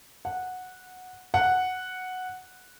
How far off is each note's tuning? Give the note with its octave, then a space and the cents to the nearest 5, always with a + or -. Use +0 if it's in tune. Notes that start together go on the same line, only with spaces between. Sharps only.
F#5 -10
F#5 -5